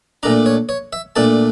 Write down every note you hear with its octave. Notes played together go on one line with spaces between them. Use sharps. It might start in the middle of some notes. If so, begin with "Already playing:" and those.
A#2 A3 D4 A#5
C#5
C#5
E5
A#2 A3 D4 A5